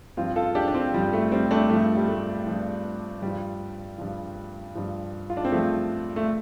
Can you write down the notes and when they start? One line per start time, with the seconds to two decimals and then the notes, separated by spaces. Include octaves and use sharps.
0.17 G2 F3 C4 F4
0.36 F4 A4
0.55 D4 G4
0.68 D4
0.74 C4 F4
0.94 G2 F3 G3
1.13 A3
1.32 G3 C4
1.51 A3 D4
1.70 G2 F3 A3
1.97 G3
2.08 A3
2.46 F3
2.51 G2
3.22 G2 F3 G3
3.98 G2 F3
4.75 G2 F3
5.30 F4
5.37 D4
5.45 C4
5.52 G2 F3 A3
6.16 A3